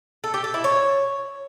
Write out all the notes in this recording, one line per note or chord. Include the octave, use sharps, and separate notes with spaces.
A4
G4
A4
E4
C#5